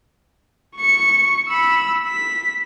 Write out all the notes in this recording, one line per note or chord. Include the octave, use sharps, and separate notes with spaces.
C#6 C#7
B5 E6
B6